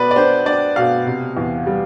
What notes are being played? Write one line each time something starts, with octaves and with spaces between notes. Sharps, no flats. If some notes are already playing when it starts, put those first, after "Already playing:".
Already playing: B2 B3 B4 D5
D5
D4 C5
D4 D5
B2 F5
C3
E2
G3